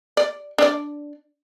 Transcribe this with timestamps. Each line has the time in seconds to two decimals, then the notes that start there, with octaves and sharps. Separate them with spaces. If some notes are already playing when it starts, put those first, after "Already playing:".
0.17 D5
0.58 D4 D5